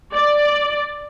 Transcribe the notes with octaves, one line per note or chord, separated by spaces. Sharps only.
D5